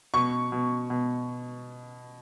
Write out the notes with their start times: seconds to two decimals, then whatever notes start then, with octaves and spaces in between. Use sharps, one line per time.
0.14 B2 C#6
0.52 B2
0.90 B2